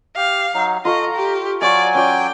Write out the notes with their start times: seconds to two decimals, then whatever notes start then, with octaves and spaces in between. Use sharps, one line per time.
0.17 G4 F5
0.54 F#3 D#4
0.85 F4 A4 D#5 A#5 C#6
1.15 G4
1.61 F#3 D5 F5 G#5 C#6
1.95 C#4 F4 D5 G5